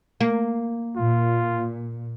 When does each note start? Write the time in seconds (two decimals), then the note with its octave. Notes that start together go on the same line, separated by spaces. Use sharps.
0.20 A#3
0.96 A#2 F4